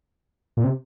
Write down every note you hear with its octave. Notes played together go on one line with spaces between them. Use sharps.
A#2
C3